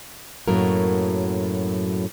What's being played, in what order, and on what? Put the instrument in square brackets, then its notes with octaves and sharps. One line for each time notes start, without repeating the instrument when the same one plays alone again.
[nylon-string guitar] F#2 A2 F#3 A#3 A#4